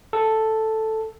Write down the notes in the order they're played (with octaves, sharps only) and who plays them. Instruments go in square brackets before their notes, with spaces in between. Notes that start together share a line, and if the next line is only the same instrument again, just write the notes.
[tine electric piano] A4